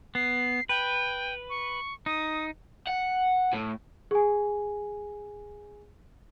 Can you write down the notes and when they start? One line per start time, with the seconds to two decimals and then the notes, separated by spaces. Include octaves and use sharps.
0.15 B3 C7
0.69 B4 G5
1.50 C#6
2.06 D#4 D#6
2.87 F#5
3.53 A2
4.11 G#4 G#5